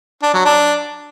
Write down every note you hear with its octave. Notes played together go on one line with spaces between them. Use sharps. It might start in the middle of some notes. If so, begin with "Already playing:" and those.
D4
F#3
D4